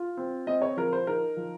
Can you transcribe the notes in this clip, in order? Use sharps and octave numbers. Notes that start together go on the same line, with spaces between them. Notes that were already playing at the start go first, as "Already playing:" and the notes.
Already playing: F4
C4
C4 D#5
C#5
F3 A#4
C5
D#4 A#4
F3